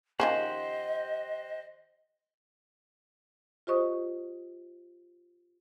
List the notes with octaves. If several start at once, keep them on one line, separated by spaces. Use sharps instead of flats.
D#3 F3 C#4 G4 C5 D#5 F#5
F4 G4 C5 D#5 C#6 D#6